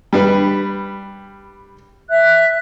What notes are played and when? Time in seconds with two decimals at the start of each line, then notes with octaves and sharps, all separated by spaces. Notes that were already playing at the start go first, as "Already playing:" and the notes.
0.13 G3 D4 B4
2.08 E5 F#6